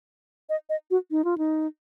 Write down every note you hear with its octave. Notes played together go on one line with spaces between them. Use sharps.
D#5
D#5
F#4
D#4
F4
D#4